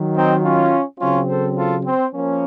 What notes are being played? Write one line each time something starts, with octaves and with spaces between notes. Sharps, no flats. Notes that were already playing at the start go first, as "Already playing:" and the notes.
Already playing: D#3 F#3
C4 D#4
C#4 F4
C#3 F#3 C4 C#4 F4
A4 C5
F4 A4
C4
F3 A#3 C#4